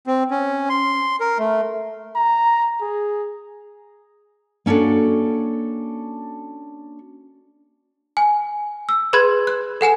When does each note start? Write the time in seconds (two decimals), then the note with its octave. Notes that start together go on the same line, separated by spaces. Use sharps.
0.07 C4
0.31 C#4
0.69 C6
1.20 A#4
1.39 A3
2.15 A#5
2.81 G#4
4.66 A#3 C#4 D4 F#4 A4
8.17 G#5
8.89 E6
9.13 G#4 B4 B5 C6 F#6 G#6
9.47 F#6
9.81 A4 F#5 G#5 E7